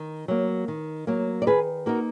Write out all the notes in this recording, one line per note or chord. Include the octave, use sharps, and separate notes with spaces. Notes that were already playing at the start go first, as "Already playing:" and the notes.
Already playing: D#3
F#3 A#3
D#3
F#3 A#3
D5
D#3 G#4 B4
A#3 D#4 F#4 A#4